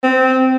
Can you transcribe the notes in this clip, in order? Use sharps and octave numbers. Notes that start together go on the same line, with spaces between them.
C4